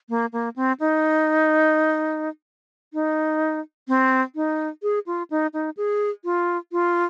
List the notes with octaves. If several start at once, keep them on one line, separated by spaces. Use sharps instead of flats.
A#3
A#3
C4
D#4
D#4
C4
D#4
G#4
F4
D#4
D#4
G#4
F4
F4